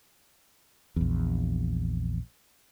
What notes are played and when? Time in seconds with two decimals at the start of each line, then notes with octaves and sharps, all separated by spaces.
0.96 A#1 E2